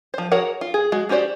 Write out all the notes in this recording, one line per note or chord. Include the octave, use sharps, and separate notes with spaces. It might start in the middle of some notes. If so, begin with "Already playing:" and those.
F3 C5
F#4 G#4 A#4 C#5 F#5
F4
G#4
G#3 F#4
C#4 F#4 G4 C5 D5